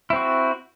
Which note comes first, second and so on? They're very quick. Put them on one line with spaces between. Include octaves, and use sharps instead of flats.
E4 C4 F#4